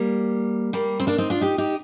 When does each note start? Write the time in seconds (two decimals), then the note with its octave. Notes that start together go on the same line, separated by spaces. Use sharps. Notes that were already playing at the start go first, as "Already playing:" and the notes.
Already playing: G3 A#3
0.73 G3 A#3
1.00 C4
1.07 A#3 D4
1.18 C4 D#4
1.30 D4 F4
1.41 D#4 G4
1.58 D#4 G4